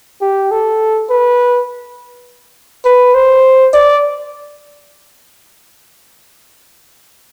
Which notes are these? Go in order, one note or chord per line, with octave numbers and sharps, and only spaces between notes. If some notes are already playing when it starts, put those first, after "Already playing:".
G4
A4
B4
B4
C5
D5